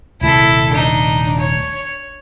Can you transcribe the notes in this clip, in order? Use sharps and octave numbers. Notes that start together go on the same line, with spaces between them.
D#1 C3 A3 E4 A4
D4 D#4
C#5